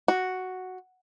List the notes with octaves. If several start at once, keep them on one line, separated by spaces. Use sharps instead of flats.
F#4